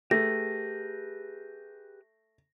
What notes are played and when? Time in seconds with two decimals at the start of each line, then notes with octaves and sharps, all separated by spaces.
0.11 A3 G4 G#4 B4 A#6